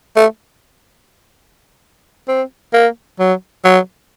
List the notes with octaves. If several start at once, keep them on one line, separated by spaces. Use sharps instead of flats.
A3
C4
A#3
F#3
F#3